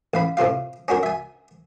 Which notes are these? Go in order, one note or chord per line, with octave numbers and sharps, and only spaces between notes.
A1 F5 B5
A2 C3 F4 F5
C#4 D4 F#4 A#4
E5 G#5